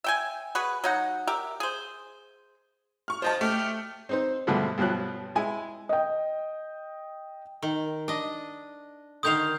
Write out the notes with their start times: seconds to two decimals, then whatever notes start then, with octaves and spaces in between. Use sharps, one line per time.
0.04 E5 G5 G#5
0.55 F#4 G#4 B4
0.84 F#3 D#4 F#5
1.27 G4 A#4 E5
1.60 G#4 C5
3.08 C#6 F6
3.22 F3 C5 D#5 A5
3.41 A3 G4 F6
4.09 C4 D#4 C5
4.47 G2 B2 D3 F3 G#3 A3
4.78 G2 B2 F3 F#3 F#6
5.35 G#3 E4 G#5
5.89 D#5 G5
7.62 D#3
8.08 D4 D#5
9.23 D3 D#3 F5 D#6 G6 F7